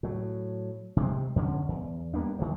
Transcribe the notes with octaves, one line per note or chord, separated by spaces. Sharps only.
A2 F#3
C3 G#3 C4
E2 D3 A3 C#4
E2
G3 A#3 B3 D4
D#3 F3 A#3